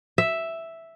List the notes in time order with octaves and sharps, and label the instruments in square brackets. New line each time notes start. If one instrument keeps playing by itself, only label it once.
[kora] E5